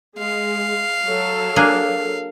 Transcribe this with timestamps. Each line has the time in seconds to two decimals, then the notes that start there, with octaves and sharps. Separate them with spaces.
0.19 G#3 F5
1.06 F#3 A4
1.56 A#3 D4 G#4